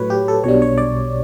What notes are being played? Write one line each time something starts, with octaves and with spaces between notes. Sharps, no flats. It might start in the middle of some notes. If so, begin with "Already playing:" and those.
Already playing: A2 F#3 A3 B4 C#5
G4
A4
B1 B2 G3 D4 C#5
C#5
D5